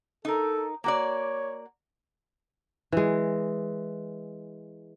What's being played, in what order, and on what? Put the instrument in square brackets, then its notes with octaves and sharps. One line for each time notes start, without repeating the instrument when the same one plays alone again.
[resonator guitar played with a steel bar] D#4 A#4 [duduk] A4
[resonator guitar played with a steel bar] A#3 F#4 D5 [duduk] C#5
[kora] E3 G#3